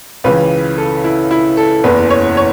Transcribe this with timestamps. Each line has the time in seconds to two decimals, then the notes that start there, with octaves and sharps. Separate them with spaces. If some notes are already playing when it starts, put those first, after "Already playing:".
0.24 C#2 C#3 E3 B4
0.78 A4
1.04 E4
1.31 E4
1.57 A4
1.84 F#1 E2 E3 B4
2.10 C#5
2.37 C#5